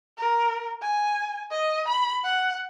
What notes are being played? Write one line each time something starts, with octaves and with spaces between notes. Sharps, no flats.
A#4
G#5
D#5
B5
F#5